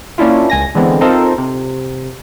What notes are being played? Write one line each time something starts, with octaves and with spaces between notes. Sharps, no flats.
A#3 C#4 D4 E4 F4
C#2 G#5 A#6
D3 E3 G#3 B3 C4
C4 D#4 F4 A4 A#4 C5
C3